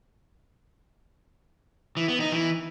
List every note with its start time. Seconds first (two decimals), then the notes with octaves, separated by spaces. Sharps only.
1.97 E3
2.08 B3
2.20 D#4
2.32 E3